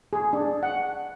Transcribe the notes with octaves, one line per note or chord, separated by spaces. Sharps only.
G#4
D4
F#5